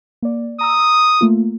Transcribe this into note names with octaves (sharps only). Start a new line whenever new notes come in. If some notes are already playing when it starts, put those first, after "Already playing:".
A#3 D5
A#5 D#6 E6
A3 A#3 F4